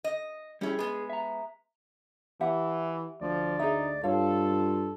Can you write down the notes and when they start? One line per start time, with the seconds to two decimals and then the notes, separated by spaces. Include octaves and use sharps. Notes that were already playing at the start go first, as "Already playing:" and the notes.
0.04 D#5
0.61 G3 C#4 E4 G4 G#4
0.79 G#3 B3 G#4
1.10 E5 A#5
2.41 E3 G4 E5 F#5
3.21 D2 F3 D5
3.59 D#4 G#4 E5
4.03 G2 F4 A4 C#5 F5